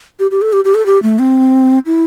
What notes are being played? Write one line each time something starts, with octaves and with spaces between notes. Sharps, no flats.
G4
G4
A4
G4
G4
A4
G4
A3
C4
E4